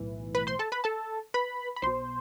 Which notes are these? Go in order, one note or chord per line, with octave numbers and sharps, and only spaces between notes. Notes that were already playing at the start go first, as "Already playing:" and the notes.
Already playing: B1 A2 E3
B4 B5
C5 C6
A4 A5
B4 B5
A4 A5
B4 B5
B5
B1 B2 C5 C6